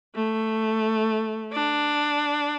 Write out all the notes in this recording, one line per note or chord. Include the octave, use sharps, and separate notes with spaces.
A3
D4